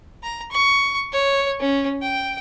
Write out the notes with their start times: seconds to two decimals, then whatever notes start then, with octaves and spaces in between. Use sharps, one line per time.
0.23 A#5
0.51 C#6
1.12 C#5
1.60 C#4
2.02 G5